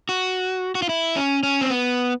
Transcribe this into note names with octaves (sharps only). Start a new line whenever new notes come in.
F#4
F#4
F4
E4
C#4
C#4
C4
B3